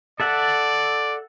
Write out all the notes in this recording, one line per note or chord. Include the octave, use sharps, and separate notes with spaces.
A4 D5 E5 F#5